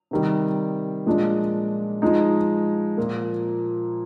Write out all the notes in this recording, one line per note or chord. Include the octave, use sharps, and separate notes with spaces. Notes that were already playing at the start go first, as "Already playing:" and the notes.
C3 D#3 G3
A#2 F3 G#3 D4
F3 G#3 D#4
A#2 F3 A#3